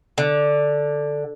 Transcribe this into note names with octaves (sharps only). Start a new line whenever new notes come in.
D3